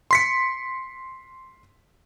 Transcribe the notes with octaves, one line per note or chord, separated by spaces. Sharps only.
C6 B6 C#7